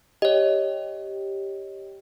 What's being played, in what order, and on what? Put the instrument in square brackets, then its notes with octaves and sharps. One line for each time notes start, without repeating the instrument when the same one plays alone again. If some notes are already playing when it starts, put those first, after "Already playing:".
[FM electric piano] G4 [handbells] C#5 D#5